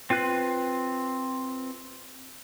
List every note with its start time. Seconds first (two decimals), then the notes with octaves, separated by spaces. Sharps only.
0.10 C4 F4 B4 F#6